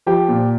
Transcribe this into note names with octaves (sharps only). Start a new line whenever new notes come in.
F3 G4
A#2